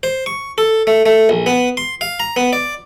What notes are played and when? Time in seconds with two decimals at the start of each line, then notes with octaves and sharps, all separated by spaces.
0.03 C5
0.26 C#6
0.58 A4
0.87 A3
1.06 A3
1.29 A#1
1.46 B3
1.77 C6
2.01 F5
2.20 A#5
2.36 B3
2.53 D5